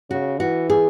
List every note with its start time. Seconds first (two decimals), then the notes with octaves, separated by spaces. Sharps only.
0.10 C#3 F#4
0.39 E3 F#4
0.70 G#4